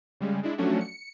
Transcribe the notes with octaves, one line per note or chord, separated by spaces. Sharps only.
C#3 G3 G#3
G#3 D4 E4
F3 F#3 A3 C#4 D4 F#4
C#7